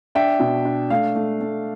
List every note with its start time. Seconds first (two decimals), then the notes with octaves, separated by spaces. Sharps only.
0.15 D4 E5 G5
0.40 B2
0.65 D4
0.90 A3 F5
1.15 A3
1.41 A3